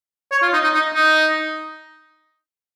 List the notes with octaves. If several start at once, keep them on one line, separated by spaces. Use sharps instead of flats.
C#5
F4
D#4
D#4
D#4
D#4